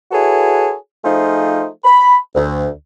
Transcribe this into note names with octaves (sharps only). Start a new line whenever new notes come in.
E4 F#4 G#4 A4 B4 C#5
F3 A3 D#4 F4 G#4 C5
B5
D2